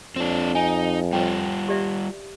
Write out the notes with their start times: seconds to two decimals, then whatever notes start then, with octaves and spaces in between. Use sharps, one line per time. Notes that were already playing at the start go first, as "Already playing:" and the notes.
0.16 F2 C4 D4
0.55 D#4 G#5
1.13 G3 F4 C#5 G5
1.69 G4 D5 E5